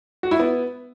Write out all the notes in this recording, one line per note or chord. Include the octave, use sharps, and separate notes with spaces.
F#4
E4
B3